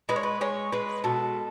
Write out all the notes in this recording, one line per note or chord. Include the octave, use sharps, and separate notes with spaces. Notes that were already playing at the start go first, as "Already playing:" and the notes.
G#3 B4
C#5
B4
G#3 C#5
G#3 B4
B2 A4